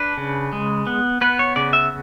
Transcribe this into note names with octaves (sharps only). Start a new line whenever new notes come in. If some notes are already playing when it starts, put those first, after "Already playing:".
Already playing: D4 B4
C#3
G#3
B3
B3 B4
C#5
C#3 D5
E5